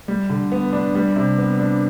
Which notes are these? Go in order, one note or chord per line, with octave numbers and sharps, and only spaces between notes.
G3
D3
B3
D4
G3
C3
B3
D4